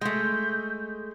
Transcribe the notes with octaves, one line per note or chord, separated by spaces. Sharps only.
G#3 A3 G6